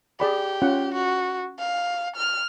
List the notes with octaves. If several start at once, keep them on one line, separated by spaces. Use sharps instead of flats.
G4 G#4 D5 B5
C#4 F4 F#5
F#4
F5
F6